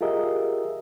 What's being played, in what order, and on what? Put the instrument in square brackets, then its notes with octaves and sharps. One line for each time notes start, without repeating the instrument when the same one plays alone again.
[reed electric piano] F4 G4 G#4 A#4 D#5 E5